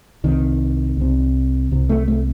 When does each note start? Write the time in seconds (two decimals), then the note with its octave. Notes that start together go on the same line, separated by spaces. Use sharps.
0.24 C2 C3 D#3
0.97 C2 C3
1.72 C2 C3
1.89 A3
2.08 A3